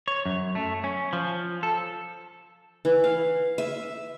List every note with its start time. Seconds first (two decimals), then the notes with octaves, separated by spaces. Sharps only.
0.08 C#5
0.26 F#2
0.55 A3
0.84 C#4
1.13 F3
1.63 A4
2.85 E3
3.04 F5
3.58 E5